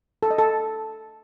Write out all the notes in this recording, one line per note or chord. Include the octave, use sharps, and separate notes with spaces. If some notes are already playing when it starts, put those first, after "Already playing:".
A4
D#5
A4